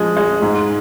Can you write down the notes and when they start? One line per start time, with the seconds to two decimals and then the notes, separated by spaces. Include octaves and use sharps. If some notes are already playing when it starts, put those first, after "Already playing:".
Already playing: F3 G#3
0.17 G#3
0.42 G#2